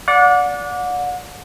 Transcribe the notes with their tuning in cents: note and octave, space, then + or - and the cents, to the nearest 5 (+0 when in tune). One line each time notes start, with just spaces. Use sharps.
D5 -15 F#5 -35